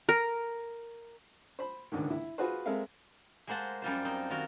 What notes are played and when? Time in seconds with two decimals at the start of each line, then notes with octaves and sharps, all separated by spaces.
0.09 A#4
1.59 C5 B5
1.92 C#2 G#2 D3 D#3
2.10 E4
2.38 F4 F#4 G#4 B4 C5
2.66 G#3 C4 A4 A#4 E5 F5
3.47 G#3 A#3 C5 F#5 A5 C6
3.82 F#2 G3 F4 C5
4.05 C4 D#4 C6
4.30 D#3 F4 F#4 A#4